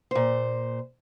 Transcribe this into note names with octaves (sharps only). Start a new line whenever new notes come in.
A#2 C5